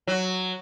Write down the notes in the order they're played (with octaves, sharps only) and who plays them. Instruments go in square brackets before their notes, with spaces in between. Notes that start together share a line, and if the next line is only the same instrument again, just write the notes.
[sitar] F#3